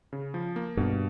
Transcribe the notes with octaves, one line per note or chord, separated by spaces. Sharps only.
C#3
F3
A#3
G2 B2